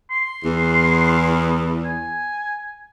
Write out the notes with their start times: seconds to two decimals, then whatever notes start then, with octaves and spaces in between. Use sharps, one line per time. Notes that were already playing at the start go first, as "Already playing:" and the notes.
0.10 C6
0.44 E2
1.85 G#5